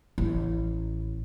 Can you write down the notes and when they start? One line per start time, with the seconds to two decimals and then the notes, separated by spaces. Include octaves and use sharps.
0.18 A1